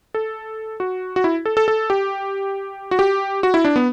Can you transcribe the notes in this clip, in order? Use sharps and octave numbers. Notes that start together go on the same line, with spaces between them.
A4
F#4
F#4
E4
A4
A4
A4
G4
F#4
G4
F#4
E4
D4
B3